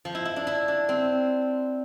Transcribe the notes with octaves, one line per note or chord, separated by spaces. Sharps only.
F3
E4
E4
D4
E4
D4
C4